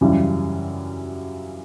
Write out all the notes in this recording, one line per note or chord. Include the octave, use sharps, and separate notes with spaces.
F#2 C#3 E3 G3